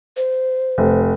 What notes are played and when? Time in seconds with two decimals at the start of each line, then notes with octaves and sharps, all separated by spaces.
0.17 C5
0.78 F1